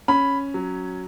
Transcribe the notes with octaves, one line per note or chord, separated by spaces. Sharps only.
C#4 B5
F#3